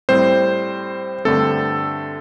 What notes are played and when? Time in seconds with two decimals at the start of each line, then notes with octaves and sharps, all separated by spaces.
0.09 A2 G3 C4 C5
1.25 G2 D3 A3 C4 A4